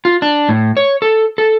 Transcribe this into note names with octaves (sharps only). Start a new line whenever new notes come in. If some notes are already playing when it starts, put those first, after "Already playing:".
F4
D4
A2
C#5
A4
A4